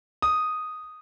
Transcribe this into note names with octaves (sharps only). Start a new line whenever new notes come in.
D#6